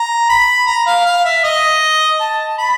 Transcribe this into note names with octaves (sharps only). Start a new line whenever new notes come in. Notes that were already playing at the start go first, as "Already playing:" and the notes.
Already playing: A#5
B5
A#5
F5
F5
E5
D#5
A5
B5